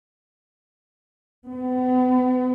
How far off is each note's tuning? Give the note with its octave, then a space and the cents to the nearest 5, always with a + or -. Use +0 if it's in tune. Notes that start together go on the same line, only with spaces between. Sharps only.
B3 +40